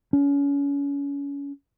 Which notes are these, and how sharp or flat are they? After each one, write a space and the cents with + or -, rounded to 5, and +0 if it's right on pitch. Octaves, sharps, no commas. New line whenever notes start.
C#4 +30